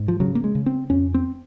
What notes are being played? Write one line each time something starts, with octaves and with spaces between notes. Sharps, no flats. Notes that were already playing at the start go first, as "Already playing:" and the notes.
Already playing: G#2
F3
C#3 F#3
A#3
G#3
C#3
C4
F2 C#4
C4